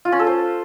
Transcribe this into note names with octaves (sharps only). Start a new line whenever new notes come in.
F4
C#4
A4
C5